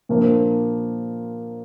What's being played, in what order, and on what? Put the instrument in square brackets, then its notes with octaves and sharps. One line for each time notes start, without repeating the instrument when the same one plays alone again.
[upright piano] A#2 F3 A#3 D4